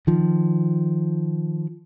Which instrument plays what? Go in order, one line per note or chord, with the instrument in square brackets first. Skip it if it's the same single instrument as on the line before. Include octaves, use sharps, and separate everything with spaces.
[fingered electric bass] D#3 F3